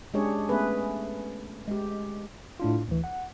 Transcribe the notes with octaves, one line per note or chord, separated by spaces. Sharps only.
G#3 C#4 D4 G4 G#4 C#5
A3 B3 C#4 G#4 B4
G#3 G4
A2 D4 F4
D2 E3
F#5